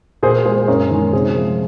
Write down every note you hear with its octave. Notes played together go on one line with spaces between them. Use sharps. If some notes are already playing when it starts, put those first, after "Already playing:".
A#2 G#4 C5
G#3 G#4 C5
F#2 A#4 C#5
D#3 G#3
C3 G#4 C5
F3 G#3